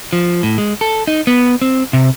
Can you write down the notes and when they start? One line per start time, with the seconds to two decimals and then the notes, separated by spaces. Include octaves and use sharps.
0.13 F3
0.43 A2
0.58 G#3
0.81 A4
1.08 D#4
1.27 B3
1.62 C4
1.93 C3